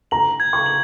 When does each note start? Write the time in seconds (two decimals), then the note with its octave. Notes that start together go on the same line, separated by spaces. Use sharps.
0.11 A#5 F#7
0.40 G#6
0.53 C#6
0.66 F#7